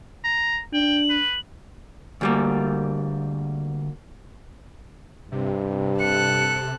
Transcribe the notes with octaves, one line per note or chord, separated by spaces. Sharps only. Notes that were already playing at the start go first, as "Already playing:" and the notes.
A#5
D4 G5 F#7
B4
D2 G3 A#3
G2 C3
A4 F#6 C#7